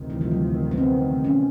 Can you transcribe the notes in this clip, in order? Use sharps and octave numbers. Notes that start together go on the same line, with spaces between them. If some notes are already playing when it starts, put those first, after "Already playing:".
Already playing: D2 C3 D#3
E3
F3
F#3
B3
C4
C#4